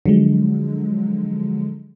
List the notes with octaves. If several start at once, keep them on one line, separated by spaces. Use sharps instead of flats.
D3 F3 F#3 G#3